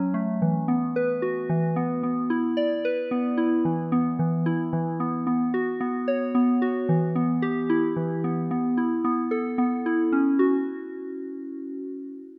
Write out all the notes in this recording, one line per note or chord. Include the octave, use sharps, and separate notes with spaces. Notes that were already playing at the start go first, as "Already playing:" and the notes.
Already playing: F#3 C#4
A3
E3
B3
B4
F#4
E3
B3
B3
E4
D5
B4
B3
E4
E3
B3
E3
E4
E3
B3
B3
F#4
B3
C#5
B3
F#4
E3
B3
G4
E4
E3
B3
B3
E4
B3
A4
B3
E4
C#4
F#4